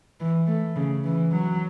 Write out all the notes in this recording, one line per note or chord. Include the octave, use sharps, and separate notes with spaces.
E3
A3
C#3
E3
F#3